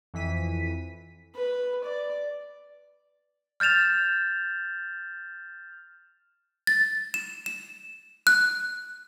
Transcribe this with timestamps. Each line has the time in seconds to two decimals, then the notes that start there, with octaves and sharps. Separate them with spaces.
0.14 F2 E3 B6 D#7
1.35 B4
1.84 D5
3.60 F6 G6 A6 E7 F7
6.67 A6
7.14 E7
7.46 E7
8.27 F#6